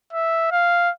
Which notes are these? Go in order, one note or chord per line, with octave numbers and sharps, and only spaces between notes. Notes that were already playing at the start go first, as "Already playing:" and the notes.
E5
F5